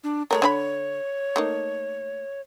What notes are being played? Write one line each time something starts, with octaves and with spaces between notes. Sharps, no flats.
D4
G#3 A3 A#4 C#5
D3 D4 B5
A3 A#3 D#4